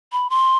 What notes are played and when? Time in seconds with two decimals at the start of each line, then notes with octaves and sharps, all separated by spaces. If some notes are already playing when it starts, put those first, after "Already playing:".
0.12 B5
0.30 C6